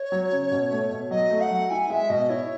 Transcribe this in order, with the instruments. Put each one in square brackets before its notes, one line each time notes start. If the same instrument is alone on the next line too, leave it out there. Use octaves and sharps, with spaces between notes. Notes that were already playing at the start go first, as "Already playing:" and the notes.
Already playing: [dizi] C#5
[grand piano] F#3
C#3
B2
A3
B2
[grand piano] F#3 [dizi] D#5
[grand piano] A3
[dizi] F#5
[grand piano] F#3
[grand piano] E4 [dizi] G#5
[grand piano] G#3 [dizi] E5
[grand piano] B2 [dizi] D#5
[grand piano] E4 [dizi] C#5